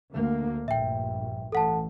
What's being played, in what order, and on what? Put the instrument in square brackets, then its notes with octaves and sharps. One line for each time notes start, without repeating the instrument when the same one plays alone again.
[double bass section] D2 D3 A#3
[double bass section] A#1 G2 [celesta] E5 G5
[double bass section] A1 [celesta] A4 F#5 A5